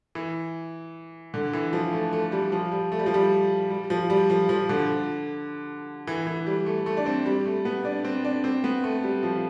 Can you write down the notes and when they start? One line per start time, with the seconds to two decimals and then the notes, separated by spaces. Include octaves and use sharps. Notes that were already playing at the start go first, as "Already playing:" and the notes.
0.15 E3
1.34 D3
1.53 E3
1.73 F3
1.93 A3
2.13 A3
2.32 G3
2.52 F3
2.72 G3
2.92 A3
2.99 G3
3.06 F3
3.14 G3
3.71 G3
3.90 F3
4.10 G3
4.30 F3
4.49 F3
4.69 D3
6.07 E3
6.27 E3
6.46 G3
6.66 A3
6.86 A3
6.97 D4
7.06 C4
7.26 G3
7.45 A3
7.65 B3
7.85 D4
8.05 C4
8.24 D4
8.44 C4
8.64 B3
8.84 A3
9.04 G3
9.23 F3